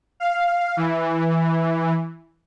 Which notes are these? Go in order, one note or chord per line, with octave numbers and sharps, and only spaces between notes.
F5
E3